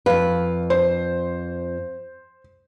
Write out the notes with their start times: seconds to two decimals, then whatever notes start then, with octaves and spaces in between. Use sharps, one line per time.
0.06 F2 B4 F5
0.70 C5